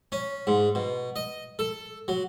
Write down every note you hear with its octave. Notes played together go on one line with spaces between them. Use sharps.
C#4
G#2
B2
D#5
A4
F#3